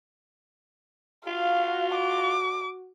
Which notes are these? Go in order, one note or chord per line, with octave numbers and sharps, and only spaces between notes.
F4 F#4 F5
D6